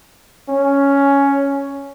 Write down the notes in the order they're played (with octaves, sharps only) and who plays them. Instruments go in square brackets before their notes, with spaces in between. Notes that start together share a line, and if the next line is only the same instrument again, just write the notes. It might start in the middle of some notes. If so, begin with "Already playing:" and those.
[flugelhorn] C#4